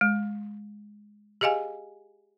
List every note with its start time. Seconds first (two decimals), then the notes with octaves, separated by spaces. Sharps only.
0.01 G#3
1.41 G4 G#4 D#5 F5 G#5